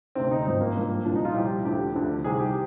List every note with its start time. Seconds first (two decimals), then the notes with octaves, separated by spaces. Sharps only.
0.15 D2 C3 D#3 C4
0.31 D#4
0.46 G#1 G2 F3 C4
0.61 A#3
0.76 G#1 G2 F3 A#3
1.05 C2 A#2 F3 D4
1.16 D#4
1.25 F4
1.34 C2 A#2 F3 G4
1.65 D2 D3 F3 G4
1.94 D2 D3 F3
2.24 C2 C3 D#3 G#4
2.40 G4